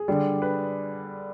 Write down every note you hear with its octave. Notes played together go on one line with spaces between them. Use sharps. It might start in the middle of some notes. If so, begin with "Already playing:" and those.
Already playing: G#4
D3 G3 D4
B4